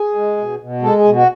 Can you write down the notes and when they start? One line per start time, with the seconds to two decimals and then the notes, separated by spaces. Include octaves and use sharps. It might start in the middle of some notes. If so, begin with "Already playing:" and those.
Already playing: G#4
0.15 G#3
0.37 B2
0.60 B2
0.82 G#3 A4
0.98 G#4
1.04 B2
1.16 F#4